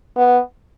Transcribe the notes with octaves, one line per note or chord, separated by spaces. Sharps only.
B3